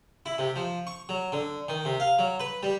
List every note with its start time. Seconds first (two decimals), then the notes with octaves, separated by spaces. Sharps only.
0.26 E4
0.38 C3
0.56 F3
0.87 C#6
1.09 F#3
1.32 D3
1.69 D#3
1.85 C3
2.00 F5
2.19 F#3
2.40 B4
2.63 G3